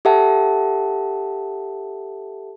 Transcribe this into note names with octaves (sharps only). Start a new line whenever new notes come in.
G4 A4 E5 F#5 A5